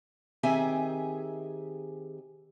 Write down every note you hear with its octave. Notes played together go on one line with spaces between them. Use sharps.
D#3 C4 G4 G#4 E5 G#5